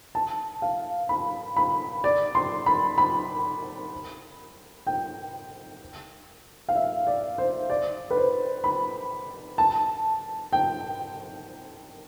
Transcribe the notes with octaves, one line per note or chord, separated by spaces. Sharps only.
A5
F5
B5
B5
D5
C6
B5
B5
G5
F5
E5
D5
C5
D5
B4
C5
B5
A5
G5